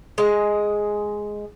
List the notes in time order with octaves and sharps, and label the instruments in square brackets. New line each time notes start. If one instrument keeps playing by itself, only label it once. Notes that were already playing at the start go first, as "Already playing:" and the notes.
[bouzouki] G#3 D#5